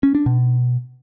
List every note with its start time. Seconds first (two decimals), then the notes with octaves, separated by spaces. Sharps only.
0.03 C#4
0.15 D4
0.26 B2